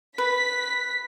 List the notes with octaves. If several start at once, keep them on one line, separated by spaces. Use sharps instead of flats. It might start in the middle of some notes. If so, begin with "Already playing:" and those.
B4 B6